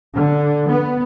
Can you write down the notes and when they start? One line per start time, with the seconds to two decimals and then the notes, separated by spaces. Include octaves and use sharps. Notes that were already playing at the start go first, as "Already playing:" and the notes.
0.14 D3
0.68 B3